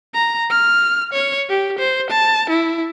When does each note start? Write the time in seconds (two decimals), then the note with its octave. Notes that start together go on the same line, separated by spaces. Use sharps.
0.14 A#5
0.50 F6
1.13 C#5
1.49 G4
1.79 C5
2.10 A5
2.50 E4